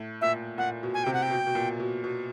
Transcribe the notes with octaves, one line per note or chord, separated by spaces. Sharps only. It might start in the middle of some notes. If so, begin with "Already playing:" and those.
Already playing: A2
A#2 E5
A#2 F#5
B2
G#5
C3 G5
F#5
G5
B2
B2
A#2
B2
B2